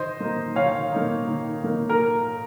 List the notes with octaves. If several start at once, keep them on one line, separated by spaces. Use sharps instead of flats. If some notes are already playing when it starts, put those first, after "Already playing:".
Already playing: D#3 C5 D#5
A#3 D#4
D#3 C#5 F5
A#3 D#4
D#3
A#3 D#4
A#4